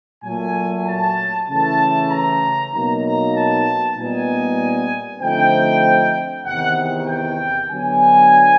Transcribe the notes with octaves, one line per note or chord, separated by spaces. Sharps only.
A#2 F#3 A3 G#5
A5
C#3 E3 A3 A5
A#5
B2 F#3 A#3 D#4 A#5
A#5
A5
A#2 G3 B3 D#4 G#5
D3 F3 A3 C4 D#4 G5
E2 C3 D#3 F#5
G5
D3 F#3 B3 D4 G#5